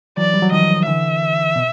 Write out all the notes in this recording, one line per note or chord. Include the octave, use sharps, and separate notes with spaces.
E3 F#3 D5
G3
F#3
D#3 F3 D#5
D3 E3 E5
B2